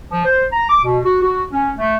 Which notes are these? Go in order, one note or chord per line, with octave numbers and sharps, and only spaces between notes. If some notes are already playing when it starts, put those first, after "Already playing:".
F3
C5
A#5
D6
B2
F#4
F#4
C#4
A3